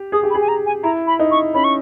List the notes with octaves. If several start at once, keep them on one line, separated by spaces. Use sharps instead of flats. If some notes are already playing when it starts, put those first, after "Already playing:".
Already playing: G4
G#4 D#6
G4
B5
G#4
G#5
A#5
G#5
E4 A#5
B5
D#4
C#6
C#4 B5
C#6